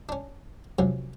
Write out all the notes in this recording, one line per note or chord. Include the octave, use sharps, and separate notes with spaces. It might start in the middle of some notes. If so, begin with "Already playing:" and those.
C#4 D4
C3 F3 F#3 C#4